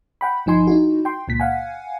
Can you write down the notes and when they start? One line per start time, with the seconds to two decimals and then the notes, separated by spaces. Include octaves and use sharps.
0.21 F#5 G5 B5
0.46 G1 F3 D#4 G#5 C6
0.67 D#4 E4 F#4
1.05 G5 C6
1.28 C#2 A#2 B6
1.40 F5 F#5 G#5